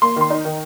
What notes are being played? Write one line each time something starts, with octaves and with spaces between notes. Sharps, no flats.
A#3 C6
D#3 C6
D#4
D#3